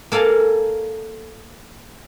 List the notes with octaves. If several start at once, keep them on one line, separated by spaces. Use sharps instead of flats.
A#3 A4 D5 F5 G#5